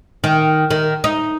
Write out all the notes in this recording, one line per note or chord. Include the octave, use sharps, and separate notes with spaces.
D#3
D#3
D#4